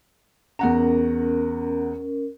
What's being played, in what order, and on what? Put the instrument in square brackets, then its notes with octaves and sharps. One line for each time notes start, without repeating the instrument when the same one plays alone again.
[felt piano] E2 F#5 A#5 [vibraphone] C#4 A#4